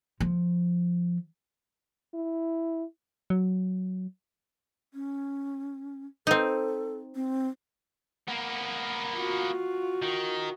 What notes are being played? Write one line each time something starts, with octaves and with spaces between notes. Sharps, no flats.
F3
E4
F#3
C#4
C4 D#4 A4
C4
A#3 B3
F4 F#4
D#3